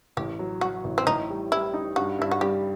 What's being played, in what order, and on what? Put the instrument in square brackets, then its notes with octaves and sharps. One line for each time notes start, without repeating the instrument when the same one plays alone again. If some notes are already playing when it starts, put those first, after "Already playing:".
[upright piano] A1 [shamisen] G4
[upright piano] F#3
[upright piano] F#3 [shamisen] F#4
[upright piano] A1
[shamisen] C4
[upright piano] A2 [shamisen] D#4
[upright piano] G3
[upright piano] G3 [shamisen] E4
[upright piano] D#4
[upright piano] G2 [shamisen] F#4
[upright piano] G2 [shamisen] E4
[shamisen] F#4
[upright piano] G3 [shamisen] G4